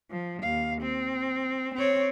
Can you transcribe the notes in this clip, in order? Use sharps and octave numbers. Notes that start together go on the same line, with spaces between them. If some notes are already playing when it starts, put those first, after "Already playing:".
F3
D#2 F5
C4
C4 C#5